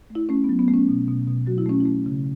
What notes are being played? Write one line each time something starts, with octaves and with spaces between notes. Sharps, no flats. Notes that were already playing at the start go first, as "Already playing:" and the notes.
A3
E4
A3 C#4
B3
F#3
B3
A3
C#4
B2
B2
B2
F#3 F#4
E4
A3 C#4
E4
A3
C#3